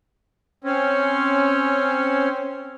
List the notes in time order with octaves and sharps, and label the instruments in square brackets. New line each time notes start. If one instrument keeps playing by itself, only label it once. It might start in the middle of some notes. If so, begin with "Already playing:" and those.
[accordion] C4 C#4